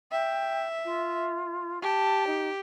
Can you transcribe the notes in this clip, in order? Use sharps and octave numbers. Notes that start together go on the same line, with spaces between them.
E5 G5
F4
G4 A5
D#4